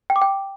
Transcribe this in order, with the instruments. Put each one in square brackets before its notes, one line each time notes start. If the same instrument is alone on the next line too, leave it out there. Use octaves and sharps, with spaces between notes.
[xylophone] G5
D6
G5